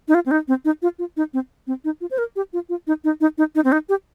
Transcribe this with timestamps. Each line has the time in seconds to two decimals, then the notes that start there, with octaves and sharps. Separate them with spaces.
0.08 D#4
0.14 F4
0.26 C4
0.31 D#4
0.48 C4
0.65 D#4
0.82 F4
0.99 F4
1.17 D#4
1.34 C4
1.67 C4
1.84 D#4
2.01 F4
2.11 C5
2.18 A#4
2.36 G4
2.53 F4
2.69 F4
2.87 D#4
3.04 D#4
3.21 D#4
3.38 D#4
3.55 D#4
3.64 C4
3.72 D#4
3.89 G4